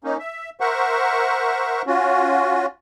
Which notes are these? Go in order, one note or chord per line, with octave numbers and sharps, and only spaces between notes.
A#3 C#4 D#4
E5
A#4 C5 E5 F#5 C#6
C#4 F4 F#4